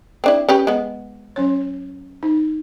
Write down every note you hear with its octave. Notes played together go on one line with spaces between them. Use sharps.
C4 D4 E4
C#4 G4 B4
G#3 B3
F#3 C#4 C#5
D#4